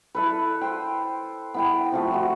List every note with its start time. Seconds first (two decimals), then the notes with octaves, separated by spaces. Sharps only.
0.15 E4 A4 B4
0.61 C5 G5
1.54 B3 E4 G5
1.92 C3 F3 A3
2.12 F#4 C5